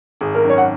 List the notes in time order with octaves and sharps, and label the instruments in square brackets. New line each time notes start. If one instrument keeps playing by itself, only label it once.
[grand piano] G#1 [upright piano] G#4
[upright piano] A#4
[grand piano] F#2 D#3
[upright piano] C#5
F#5